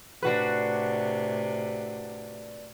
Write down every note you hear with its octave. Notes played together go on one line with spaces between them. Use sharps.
A2 C3 D4 F#4 B4